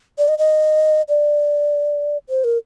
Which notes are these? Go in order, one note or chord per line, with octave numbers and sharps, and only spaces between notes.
D5
D#5
D#5
D5
C5
A#4